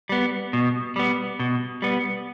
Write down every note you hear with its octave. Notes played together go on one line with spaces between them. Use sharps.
G3 B3
B2
G3 B3
B2
G3 B3